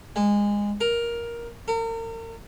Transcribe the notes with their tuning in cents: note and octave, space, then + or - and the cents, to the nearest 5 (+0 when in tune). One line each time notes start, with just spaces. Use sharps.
G#3 -20
A#4 +10
A#4 -40